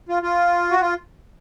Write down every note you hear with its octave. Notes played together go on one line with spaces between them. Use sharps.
F4
F4
F#4
F4